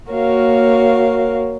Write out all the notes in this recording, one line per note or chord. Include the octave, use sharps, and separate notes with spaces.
A#3 F#4 A#4 C#5 F5